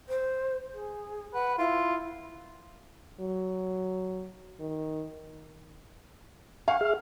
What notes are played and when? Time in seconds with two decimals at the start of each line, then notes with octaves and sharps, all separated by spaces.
0.09 C5
0.73 G#4
1.34 B4 F#5
1.58 E4 F4
3.20 F#3
4.60 D#3
6.68 F5 F#5 G#5 C#6
6.81 G#4 E5 F6